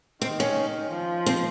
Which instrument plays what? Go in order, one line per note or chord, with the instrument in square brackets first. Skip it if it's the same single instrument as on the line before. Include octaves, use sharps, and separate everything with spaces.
[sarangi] D#3 [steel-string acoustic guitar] C4
[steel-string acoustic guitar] C#4
[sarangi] F3
[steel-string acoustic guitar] C4